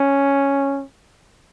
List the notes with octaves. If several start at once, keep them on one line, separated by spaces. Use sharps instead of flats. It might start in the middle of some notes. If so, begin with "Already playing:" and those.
Already playing: C#4